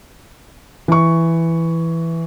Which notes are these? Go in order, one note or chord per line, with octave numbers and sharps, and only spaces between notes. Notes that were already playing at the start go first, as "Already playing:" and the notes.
E3 C#6